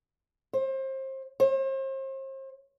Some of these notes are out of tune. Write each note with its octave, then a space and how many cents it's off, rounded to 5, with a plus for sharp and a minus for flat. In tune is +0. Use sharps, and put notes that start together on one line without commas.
C5 +30
C5 +40